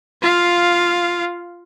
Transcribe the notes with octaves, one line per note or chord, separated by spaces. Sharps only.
F4 F5